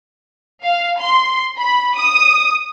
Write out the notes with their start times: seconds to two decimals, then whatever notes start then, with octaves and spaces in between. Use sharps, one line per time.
0.63 F5
0.98 C6
1.58 B5
1.96 D#6